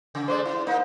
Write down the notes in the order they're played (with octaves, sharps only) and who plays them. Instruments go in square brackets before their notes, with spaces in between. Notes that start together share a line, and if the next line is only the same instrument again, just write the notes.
[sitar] C#3
[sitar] G#3 A3 D5 [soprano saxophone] C5
[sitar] E4
A#3 D#4